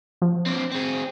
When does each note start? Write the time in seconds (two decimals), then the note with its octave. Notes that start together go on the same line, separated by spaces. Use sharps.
0.22 F3
0.46 C4 D4
0.72 C4 G#4